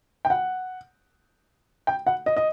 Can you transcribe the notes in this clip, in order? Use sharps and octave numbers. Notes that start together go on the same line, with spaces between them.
G5
F#5
G5
F#5
D#5
D#5